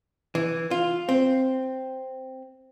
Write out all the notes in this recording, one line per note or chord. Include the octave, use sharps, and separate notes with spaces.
E3
F4
C4